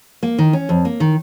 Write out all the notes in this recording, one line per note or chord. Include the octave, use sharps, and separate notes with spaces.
A#3
D#3
C#4
F2
A#3
D#3